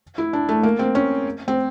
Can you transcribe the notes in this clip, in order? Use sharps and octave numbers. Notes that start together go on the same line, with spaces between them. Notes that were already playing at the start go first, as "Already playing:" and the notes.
E4
D4
A3
A#3
C4
C#4
C4